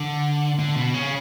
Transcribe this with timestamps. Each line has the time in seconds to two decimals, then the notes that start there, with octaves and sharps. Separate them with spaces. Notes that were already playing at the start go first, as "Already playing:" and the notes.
Already playing: D3
0.59 D3
0.76 B2
0.94 C#3